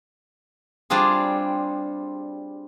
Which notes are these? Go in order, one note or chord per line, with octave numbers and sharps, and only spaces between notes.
G3 C4 D4 F4 G#4